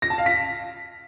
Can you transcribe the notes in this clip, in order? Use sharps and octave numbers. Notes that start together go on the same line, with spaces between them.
A#6
A5
F5
B6